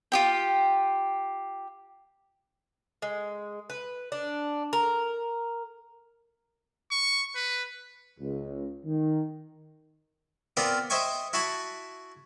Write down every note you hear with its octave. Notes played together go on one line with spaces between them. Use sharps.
F4 G4 G5
G#3
B4
D4
A#4
C#6
B4
C#2
D#3
B3 C4 F4 A#4 D5
C5 D#5 E5 G5 G#5 C#6
E4 F#4 G#5 A5 B5